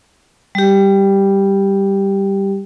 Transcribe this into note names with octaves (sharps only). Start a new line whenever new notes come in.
G3 G4